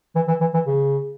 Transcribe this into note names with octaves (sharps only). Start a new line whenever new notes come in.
E3
E3
E3
E3
C#3